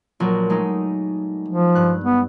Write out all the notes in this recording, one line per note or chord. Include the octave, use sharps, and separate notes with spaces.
A#1 F#3
G#3 A3 D#4
F3
G2 F#6
B3